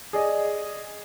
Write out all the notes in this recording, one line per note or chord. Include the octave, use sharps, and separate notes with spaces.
G#4 D5 D#5